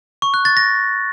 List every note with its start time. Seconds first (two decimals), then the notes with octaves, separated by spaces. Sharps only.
0.22 C#6
0.34 F#6
0.45 A6
0.57 A#6